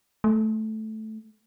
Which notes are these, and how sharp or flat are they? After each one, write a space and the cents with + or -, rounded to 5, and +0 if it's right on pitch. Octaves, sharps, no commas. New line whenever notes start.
A3 -10